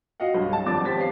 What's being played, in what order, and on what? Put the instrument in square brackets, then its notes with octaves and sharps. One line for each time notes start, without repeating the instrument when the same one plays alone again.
[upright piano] F#4 D#5 F5 F#5
B1 G2
A5
G#1 F3 C4 D4 D6 A6
G4 C5 C#5 A6 B6
B3 F5 C7